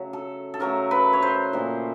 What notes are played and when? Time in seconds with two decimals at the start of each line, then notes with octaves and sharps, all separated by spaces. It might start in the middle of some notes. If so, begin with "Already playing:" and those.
Already playing: C#3 F#3 A3
0.13 A4
0.54 A4
0.60 C#3 F#3 A3 A#4
0.91 B4
1.13 C#5
1.23 C5
1.53 A#2 F3 A3